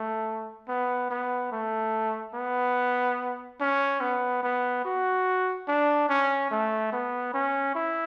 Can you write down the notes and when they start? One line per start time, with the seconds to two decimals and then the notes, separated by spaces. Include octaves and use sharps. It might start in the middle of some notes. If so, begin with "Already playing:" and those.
Already playing: A3
0.68 B3
1.11 B3
1.52 A3
2.34 B3
3.60 C#4
4.01 B3
4.43 B3
4.85 F#4
5.68 D4
6.09 C#4
6.51 A3
6.93 B3
7.34 C#4
7.75 E4